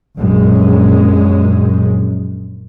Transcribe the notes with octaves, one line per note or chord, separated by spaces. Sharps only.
A#1 F#2 G#3 C#4